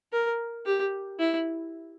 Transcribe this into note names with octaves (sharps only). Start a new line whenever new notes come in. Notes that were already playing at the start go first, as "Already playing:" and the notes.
A#4
G4
E4